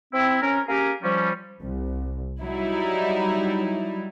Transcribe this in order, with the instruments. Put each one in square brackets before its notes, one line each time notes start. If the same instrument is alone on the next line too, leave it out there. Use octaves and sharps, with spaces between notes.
[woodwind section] C4 E4
C#4 A#4
A#3 C#4 G4 G#4 A#4
F3 G3 C#4
[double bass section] C2
[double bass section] F#3 [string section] G3 D#4 E4